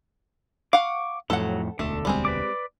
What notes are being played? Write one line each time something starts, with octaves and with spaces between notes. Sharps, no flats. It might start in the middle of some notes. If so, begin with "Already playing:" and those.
F5 F#5 C#6 D6
F2 A2 F#3 A4 F#5
E1 D2 D3 A3 A4
G3 G#3 C4
B4 D5 D6